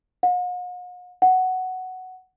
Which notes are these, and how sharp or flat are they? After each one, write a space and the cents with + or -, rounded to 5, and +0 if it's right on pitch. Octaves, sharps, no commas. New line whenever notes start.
F#5 -45
F#5 +5